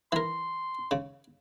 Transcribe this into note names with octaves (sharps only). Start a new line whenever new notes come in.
E3 A#4 C6
C#3